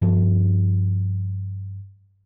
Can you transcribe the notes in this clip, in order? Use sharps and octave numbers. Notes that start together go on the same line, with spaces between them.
G2 F3